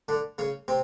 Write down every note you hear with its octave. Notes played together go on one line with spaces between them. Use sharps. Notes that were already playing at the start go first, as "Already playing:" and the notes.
D3 D4
C#3 C#4
C3 C4